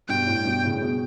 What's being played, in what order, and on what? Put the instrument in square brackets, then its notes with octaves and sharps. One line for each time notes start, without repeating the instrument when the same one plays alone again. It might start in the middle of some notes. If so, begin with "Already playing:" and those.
[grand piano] G2 B2 [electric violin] G5
[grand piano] A2
G2 B2
A2 C#3
B2